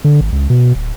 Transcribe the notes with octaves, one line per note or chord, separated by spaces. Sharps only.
D3
G#1
C#2
B2
D1